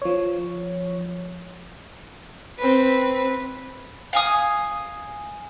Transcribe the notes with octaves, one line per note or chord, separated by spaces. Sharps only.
F3 C#5
C4 B4
F5 G#5 D#6